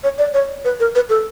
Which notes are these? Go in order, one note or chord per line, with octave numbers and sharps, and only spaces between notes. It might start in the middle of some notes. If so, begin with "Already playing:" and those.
C#5
D5
C#5
B4
A#4
B4
A4